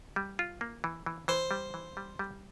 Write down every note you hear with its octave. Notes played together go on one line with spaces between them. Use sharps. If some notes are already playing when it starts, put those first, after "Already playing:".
G3
F4
A#3
E3
E3
E3 C5
G3
E3
G3
G3